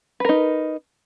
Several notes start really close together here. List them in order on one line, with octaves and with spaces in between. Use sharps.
B4 A#4 D#4